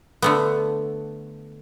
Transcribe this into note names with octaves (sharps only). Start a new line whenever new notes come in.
D3 A3 B3